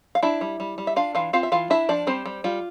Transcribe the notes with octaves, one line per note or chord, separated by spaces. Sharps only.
F5
D4 E4 E5
G3
G3
G3
E5
D4 F4 F5
E3 F4 F5
C4 F4 F5
E5
E3 F4 F5
D4 E4 E5
F3 D4 D5
G3 C4 C5
G3
G3 F4